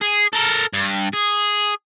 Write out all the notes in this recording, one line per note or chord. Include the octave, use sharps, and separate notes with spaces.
G#4
A4 A#4
G2
G#4